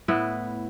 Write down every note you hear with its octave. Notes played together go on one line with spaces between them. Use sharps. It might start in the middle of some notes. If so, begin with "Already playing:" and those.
A2 B3 E4